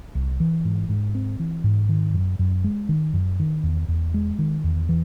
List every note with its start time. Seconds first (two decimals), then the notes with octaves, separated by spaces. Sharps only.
0.15 C2
0.40 E3
0.65 G#2
0.89 G#2
1.15 C4
1.40 E3
1.64 G#2
1.89 D#3
2.14 F#2
2.39 F#2
2.64 G#3
2.89 D#3
3.13 F#2
3.40 D#3
3.63 E2
3.88 E2
4.14 G#3
4.39 D#3
4.64 E2
4.89 E3